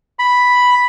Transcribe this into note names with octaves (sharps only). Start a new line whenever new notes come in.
B5